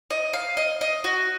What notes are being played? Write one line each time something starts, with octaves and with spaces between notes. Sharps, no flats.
D#5
F5
D#5
D#5
F#4